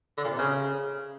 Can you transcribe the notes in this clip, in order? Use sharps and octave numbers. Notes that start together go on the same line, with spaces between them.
D3
A#2
C3
C#3